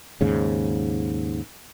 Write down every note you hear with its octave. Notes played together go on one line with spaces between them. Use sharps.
D#2 G#2 C#3